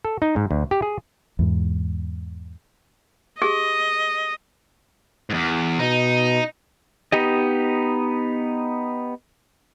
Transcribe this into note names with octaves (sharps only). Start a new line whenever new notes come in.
A4
D#4
G#2
D2
G4
G#4
E2 G#2
G4 G#4 D#5
E2 G#2
B2 D#4
B3 D#4 G4 D#5